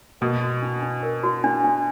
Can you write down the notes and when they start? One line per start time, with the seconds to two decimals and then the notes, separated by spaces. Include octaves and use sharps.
0.21 B2 A#4
0.41 F#4
0.62 D4
0.83 D4
1.03 A#4
1.23 F#4
1.44 D4
1.64 D4